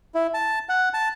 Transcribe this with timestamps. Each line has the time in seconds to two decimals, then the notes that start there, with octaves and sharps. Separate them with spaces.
0.15 E4
0.34 A5
0.69 F#5
0.94 A5